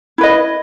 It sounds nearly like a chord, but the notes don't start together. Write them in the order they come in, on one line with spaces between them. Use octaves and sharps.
E4 B4 D#5